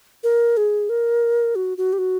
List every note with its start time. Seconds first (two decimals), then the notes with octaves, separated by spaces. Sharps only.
0.23 A#4
0.57 G#4
0.89 A#4
1.56 F#4
1.78 F#4
1.93 G4
1.98 F#4